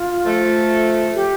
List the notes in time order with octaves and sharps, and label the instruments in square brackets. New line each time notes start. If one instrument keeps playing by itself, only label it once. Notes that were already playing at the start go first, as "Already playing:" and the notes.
Already playing: [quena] F4
[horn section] F3 A3
[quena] G4